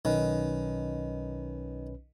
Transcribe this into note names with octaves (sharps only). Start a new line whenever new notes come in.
B1 D#3 C#4 B4